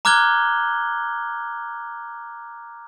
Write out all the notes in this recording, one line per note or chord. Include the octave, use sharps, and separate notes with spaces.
A#5 D6 F6 F#6 G#6 G7